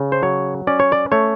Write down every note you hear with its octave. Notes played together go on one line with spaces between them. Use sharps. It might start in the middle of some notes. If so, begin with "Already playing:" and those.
Already playing: C#3
C5
F#3 C#5
C#4 D5
C#5
D5
A3 C#5